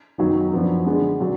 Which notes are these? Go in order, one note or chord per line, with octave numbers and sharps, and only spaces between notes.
F#2 D#3 F#3 B3 D#4
F#2 F3 B3 D4
D3 G#3 B3 D4
D3 F#3 D4